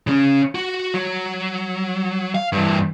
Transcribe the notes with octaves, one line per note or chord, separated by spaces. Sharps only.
C#3 C#4
F#4
F#3
F5
G2 E3